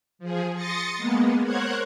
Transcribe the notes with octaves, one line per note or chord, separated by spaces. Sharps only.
F3 G#4
C6 D#6 A6 A#6 C#7
G#3 A#3 B3
A#4 C5 C#5 F#5 F#6 G#6